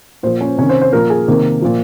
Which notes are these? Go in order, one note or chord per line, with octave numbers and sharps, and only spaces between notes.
A#2 F3 C5
C#4
C3 D#3 C#4
C5
C5
A#2 F3 A#4
G#4
C3 D#3 A#3
A#2 F3